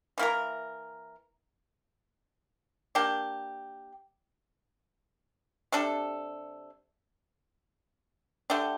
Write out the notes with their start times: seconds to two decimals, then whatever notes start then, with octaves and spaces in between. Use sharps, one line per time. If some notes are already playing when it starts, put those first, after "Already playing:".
0.18 E3 A#3 E4 A#4
2.95 A#3 D4 G4
5.72 C3 G3 D4 A4
8.50 D3 A3 D4 G4